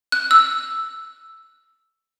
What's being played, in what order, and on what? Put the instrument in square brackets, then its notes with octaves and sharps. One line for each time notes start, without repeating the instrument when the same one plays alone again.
[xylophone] F#6
E6